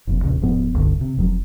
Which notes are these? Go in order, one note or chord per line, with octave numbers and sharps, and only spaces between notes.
F#1 F2 B2
A#1 E2 A#2 C#3
D#1 G#2 F3 B3
E1 C2 G2 D3
C3
F1 F2 F#3